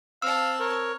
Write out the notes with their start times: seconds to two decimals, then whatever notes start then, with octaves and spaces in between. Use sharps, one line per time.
0.22 C4 F5 A5 E6
0.60 A#4 C#5